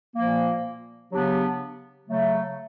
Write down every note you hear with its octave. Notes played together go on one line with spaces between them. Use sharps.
A#2 F3 A#3
C#3 F#3 B3 D4 G4
C#3 F#3 A3